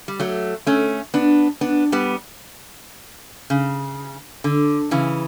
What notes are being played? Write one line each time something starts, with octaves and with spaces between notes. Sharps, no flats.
G3
F#3 A3
A3 C#4
B3 D4
B3 D4
G3 B3
C#3
D3
C#3 E3